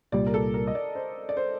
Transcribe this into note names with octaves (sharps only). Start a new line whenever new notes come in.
C2 A#2 G3 D5
A#4
A4
A#4
D#5
D5
C5
D5
C5